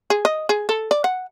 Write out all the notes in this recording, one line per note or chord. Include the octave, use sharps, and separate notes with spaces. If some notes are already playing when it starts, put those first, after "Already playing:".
G#4
D#5
G#4
A4
D5
F#5